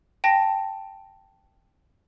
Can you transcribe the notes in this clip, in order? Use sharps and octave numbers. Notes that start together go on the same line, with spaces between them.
G5 A5 A#6